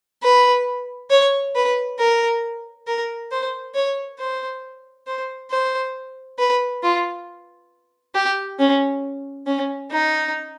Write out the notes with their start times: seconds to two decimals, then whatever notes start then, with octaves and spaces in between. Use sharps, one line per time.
0.23 B4
1.10 C#5
1.55 B4
1.99 A#4
2.87 A#4
3.31 C5
3.75 C#5
4.19 C5
5.07 C5
5.51 C5
6.39 B4
6.83 F4
8.15 G4
8.59 C#4
9.46 C#4
9.91 D#4